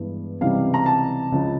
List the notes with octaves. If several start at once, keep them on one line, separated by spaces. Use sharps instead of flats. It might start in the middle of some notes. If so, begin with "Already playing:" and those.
Already playing: G2 E3 G#3 B3
C#2 C3 E3 G3 F5
A#5
A5
C#2 C#3 F3